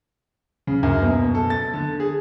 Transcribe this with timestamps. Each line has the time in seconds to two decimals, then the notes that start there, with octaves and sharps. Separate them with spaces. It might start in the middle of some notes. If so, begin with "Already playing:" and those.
0.67 C#3
0.83 F#2
1.02 B2
1.35 A4
1.50 A6
1.74 D3
2.00 G#4